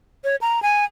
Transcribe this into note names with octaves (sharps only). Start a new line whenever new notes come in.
C#5
A#5
G#5